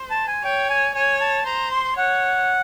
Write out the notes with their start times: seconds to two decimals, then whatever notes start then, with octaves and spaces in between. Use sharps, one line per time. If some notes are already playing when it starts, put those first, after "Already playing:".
Already playing: C5
0.10 A5
0.27 G#5
0.44 C#5 G5
0.70 G#5
0.95 C#5 G#5
1.20 A5
1.46 C5 A#5
1.71 C6
1.97 C#5 F#5